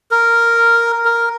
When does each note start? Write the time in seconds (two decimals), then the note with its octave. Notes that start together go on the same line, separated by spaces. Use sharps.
0.11 A#4
1.05 A#4